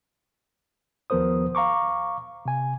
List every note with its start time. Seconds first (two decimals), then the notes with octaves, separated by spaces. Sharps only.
1.10 D#2 F3 B3 A#4 C5 D#6
1.55 F5 A#5 C#6 D6
2.45 C3 G#5